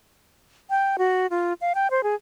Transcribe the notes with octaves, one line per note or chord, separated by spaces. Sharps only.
G5
F#4
F4
F5
G5
C5
G#4